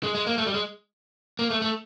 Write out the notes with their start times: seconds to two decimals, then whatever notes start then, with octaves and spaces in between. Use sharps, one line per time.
0.03 G#3
0.15 G#3
0.27 A#3
0.38 A3
0.46 G3
0.54 G#3
1.39 A#3
1.50 A3
1.62 A3